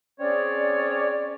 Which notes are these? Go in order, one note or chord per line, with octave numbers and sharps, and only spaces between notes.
C4 C#4 G#4 C#5 D5